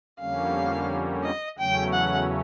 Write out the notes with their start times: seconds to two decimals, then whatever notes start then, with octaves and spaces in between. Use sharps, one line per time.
0.19 F2 D3 G3 A#3 C#4 F5
1.24 D#5
1.58 E2 C#3 F#3 A3 C#4 G5
1.93 F#5